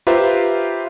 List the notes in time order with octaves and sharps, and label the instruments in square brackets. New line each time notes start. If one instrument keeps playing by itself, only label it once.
[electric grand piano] F4 G4 B4 C5 E5 A#5